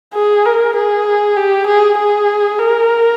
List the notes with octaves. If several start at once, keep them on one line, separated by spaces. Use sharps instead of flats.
G#4
A#4
G#4
G4
G#4
G#4
A#4